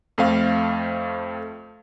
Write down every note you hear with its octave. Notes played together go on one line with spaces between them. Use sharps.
F2 A3 C4 F5